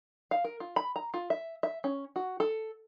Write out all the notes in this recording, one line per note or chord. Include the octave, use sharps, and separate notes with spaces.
F5
A#4
F4
B5
A#5
F4
E5
E5
C#4
F#4
A4